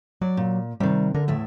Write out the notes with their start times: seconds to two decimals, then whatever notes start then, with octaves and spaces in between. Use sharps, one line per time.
0.21 F#3 D5
0.37 A#2
0.80 C3 D#3 G3
1.14 D3 A#4
1.28 E2 A2 E5